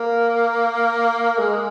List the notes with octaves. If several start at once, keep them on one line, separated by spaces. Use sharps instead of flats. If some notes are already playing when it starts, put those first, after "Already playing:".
Already playing: A#3
G#3